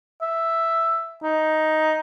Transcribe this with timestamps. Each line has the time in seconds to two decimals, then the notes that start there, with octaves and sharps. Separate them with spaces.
0.22 E5
1.23 D#4